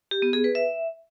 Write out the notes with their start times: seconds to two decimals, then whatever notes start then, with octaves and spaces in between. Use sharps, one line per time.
0.11 G4
0.22 B3
0.33 G#4
0.44 B4
0.55 E5